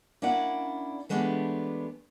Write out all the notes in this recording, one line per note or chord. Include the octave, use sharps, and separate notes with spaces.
A#3 C#4 D4 E4 D5 F#5
E3 G#3 A3 B3 D4 G4